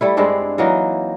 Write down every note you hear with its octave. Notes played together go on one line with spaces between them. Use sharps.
G3 A3 E4
G2 G#3 C4 D4
E3 F#3 A#3 D#4